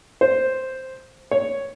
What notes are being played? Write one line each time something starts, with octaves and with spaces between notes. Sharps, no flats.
C5
C#5